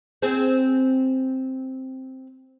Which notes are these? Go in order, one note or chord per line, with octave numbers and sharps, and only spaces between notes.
C4 G#4